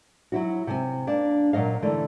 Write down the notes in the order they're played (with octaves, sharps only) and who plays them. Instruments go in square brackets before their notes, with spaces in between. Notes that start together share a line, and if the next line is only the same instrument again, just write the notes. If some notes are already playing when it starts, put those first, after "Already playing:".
[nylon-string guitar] F#3 E4 F#4
C3 G#5
A#3 D4
A#2 F#3 D#5 F5
D3 E3 A3